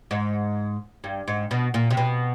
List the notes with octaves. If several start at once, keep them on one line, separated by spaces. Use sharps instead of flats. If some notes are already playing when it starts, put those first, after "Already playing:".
G#2
G2
G#2
B2
A#2
C3
B2